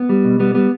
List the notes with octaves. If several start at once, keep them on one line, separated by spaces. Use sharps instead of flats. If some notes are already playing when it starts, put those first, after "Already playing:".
Already playing: B3
G3
B2
G3 B3
G3 B3